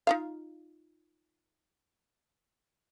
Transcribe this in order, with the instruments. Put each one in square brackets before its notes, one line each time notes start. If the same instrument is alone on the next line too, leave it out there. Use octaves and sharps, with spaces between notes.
[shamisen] D#4 F4 F5